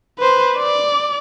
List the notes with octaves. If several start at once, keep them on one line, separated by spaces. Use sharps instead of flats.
B4 C5
D5